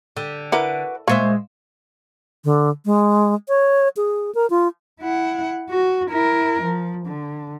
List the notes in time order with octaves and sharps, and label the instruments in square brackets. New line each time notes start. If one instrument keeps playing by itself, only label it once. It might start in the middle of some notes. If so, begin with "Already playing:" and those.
[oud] D3 [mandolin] G4
[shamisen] E4 A#4 [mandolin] F#4 B4 D6
[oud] A#2 G#3 E5 [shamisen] A#3 [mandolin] C5 C#6
[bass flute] D3
G#3
C#5
G#4
A#4
F4
[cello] E4 F#5
F#4
E4 A#4
F3
D3